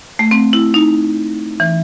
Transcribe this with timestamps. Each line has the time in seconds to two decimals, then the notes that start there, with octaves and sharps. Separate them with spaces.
0.19 A3
0.31 C4
0.53 E4
0.74 D#4
1.60 E3